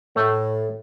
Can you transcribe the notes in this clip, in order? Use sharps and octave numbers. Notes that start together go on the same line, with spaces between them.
A2 A3